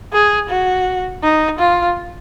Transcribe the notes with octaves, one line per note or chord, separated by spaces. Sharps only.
G#4
F#4
D#4
F4